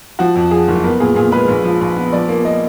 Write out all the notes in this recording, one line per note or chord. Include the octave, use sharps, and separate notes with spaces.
F3 F#4
F2
F3 G#4
F#1
B3 A#4
A#2 G#4
A#2 G#4
G#3 B4
A#1
F3
A#1
B3
F3 D5
A#3
A#3 D#5